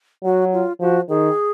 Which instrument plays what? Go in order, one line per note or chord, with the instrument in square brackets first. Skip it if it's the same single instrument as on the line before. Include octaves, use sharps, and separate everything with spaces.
[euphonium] F#3 [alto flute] F#4
[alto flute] F4
[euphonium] F3 [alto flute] F#4
[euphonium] D#3 [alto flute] G#4